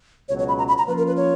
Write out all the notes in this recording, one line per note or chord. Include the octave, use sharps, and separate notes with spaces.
C#2 B2 F#3 C#5
C#5
B5
A#5
B5
A#5
F3 A#3 C#4 F4 B4
A#4
B4
C#5